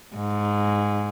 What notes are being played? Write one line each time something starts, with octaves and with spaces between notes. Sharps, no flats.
G#2